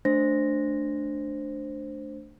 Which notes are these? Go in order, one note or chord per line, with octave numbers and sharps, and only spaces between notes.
A3 D4 C5 A#6